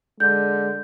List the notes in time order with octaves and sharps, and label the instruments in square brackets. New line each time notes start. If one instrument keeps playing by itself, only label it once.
[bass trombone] D3 [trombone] G#3 [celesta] G6